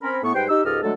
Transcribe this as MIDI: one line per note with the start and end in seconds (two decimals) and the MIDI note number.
0.02 0.19 60
0.02 0.19 61
0.02 0.19 70
0.02 0.19 83
0.23 0.34 45
0.23 0.34 59
0.23 0.34 85
0.35 0.45 44
0.35 0.45 55
0.35 0.45 71
0.35 0.45 72
0.35 0.45 79
0.48 0.65 63
0.48 0.65 67
0.48 0.65 88
0.65 0.81 37
0.65 0.81 44
0.65 0.81 67
0.65 0.81 69
0.65 0.81 75
0.65 0.81 89
0.83 0.93 50
0.83 0.93 54
0.83 0.93 56
0.83 0.93 57
0.83 0.93 69